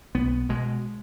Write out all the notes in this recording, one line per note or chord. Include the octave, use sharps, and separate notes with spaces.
B1 B3
B2 G#3